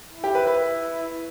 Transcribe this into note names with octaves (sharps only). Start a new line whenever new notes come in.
E4
G4
B4
B4